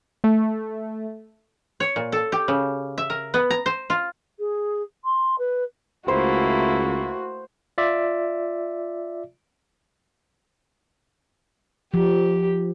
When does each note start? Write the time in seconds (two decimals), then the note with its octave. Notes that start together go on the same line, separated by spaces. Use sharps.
0.24 A3
1.80 C#5
1.96 A#2
2.12 A4
2.32 G4
2.48 C#3
2.98 E5
3.10 A#4
3.34 B3
3.50 A#5
3.66 C5
3.90 F4
4.39 G#4
5.04 C6
5.38 B4
6.08 C#2 A3 A#3 E4 F#4 C5
7.78 F4 D5 E5
11.94 F3 G4